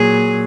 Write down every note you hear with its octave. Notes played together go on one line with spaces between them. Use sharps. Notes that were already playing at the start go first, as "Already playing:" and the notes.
Already playing: A#2 F#3 G#4